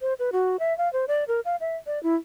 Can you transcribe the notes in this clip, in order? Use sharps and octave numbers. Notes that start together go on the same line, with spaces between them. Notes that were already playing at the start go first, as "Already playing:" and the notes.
C5
B4
F#4
E5
F5
C5
D5
A#4
F5
E5
D5
E4